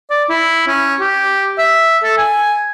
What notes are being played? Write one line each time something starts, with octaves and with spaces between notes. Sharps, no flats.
D5
E4
C#4
G4
E5
A4
G#5